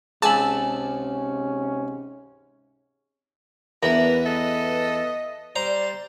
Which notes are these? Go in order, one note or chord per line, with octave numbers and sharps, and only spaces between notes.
C#2 G#2 C3 C#4 G#5 A5 B5 E6
E2 D4 A#4 B4 E5
A4 D#5
G3 C5 D5 A#5